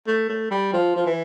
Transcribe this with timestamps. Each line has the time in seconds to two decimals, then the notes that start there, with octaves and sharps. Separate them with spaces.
0.07 A3
0.29 A3
0.51 G3
0.73 F3
0.96 F3
1.06 E3